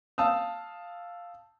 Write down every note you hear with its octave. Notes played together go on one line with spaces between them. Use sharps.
F5 A5 D#6 E6